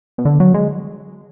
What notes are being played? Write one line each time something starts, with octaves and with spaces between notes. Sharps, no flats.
B2
D3
F#3
G#3